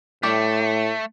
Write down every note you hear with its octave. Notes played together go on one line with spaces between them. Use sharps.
A2 G3 A3 G4